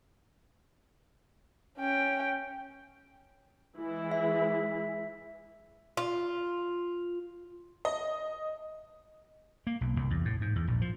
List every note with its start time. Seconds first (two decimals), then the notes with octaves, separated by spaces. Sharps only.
1.78 C#4 G5
3.75 E3 G#3 E4
4.11 E5
5.97 F4
7.85 D#5
9.67 A#3
9.81 B1
9.96 C2
10.10 E2
10.25 A2
10.41 G#2
10.56 E2
10.68 A#1
10.81 F3